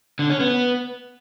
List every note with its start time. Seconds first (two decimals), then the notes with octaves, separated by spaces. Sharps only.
0.19 D3
0.30 C#4
0.40 B3